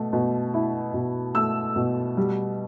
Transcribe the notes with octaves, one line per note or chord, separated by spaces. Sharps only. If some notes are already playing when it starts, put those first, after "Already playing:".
Already playing: B2 A3
B2
E4
B2
A3 E6
B2
G3